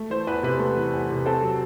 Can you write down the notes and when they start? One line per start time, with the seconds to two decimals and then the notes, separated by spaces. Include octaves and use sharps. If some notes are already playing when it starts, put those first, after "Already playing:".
Already playing: A3
0.10 E3 C5
0.27 E2 B4
0.43 C3 B4
0.60 A3
0.77 E3
0.94 E2
1.10 C3
1.26 C4 A4
1.43 F#3